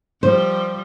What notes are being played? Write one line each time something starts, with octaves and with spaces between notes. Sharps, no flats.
F3 G3 C5